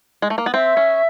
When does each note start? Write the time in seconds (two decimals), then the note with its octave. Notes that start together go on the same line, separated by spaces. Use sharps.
0.22 G#3
0.30 A3
0.38 A#3
0.46 B3
0.54 C4 E5
0.77 C#4